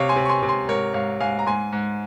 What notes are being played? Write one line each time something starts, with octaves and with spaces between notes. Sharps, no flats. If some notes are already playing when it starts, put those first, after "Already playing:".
Already playing: C3 C#5 F5
G#5 C6
C3
C#6
G#5 C6
C3
G#5 C6
G#2 A#4 C#5
G#2 C#5 F5
G#2 F5 G#5
A#5
G#2 G#5 C6
G#2